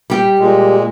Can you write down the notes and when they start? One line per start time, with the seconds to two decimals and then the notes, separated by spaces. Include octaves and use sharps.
0.10 G3 G4
0.39 A#2 G#3